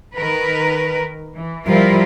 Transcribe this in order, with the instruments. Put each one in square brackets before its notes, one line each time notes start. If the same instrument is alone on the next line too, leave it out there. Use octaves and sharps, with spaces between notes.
[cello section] D#3 A#4 B4
E3
[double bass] F3 G3 [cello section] E4 F4 A#4